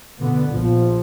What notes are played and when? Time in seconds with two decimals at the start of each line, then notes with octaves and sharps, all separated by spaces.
0.20 B2 D3 B3
0.50 A#1 F3